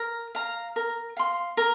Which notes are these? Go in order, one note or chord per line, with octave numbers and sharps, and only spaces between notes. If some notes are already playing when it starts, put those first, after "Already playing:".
Already playing: A#4
F5 A#5
A#4
F5 C6
A#4